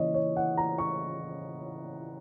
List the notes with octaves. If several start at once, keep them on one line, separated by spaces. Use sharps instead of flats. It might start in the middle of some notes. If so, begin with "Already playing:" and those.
Already playing: C#3 E3 A#3 C#5 D#5
C#5
F#5
A#5
C#6